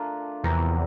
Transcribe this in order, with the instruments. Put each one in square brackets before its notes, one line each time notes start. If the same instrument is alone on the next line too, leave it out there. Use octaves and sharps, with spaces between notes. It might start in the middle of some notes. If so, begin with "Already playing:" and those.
Already playing: [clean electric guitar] A3 D4 F4 A#4
[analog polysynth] E2 [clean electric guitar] C3 F3 C4 G4 A#4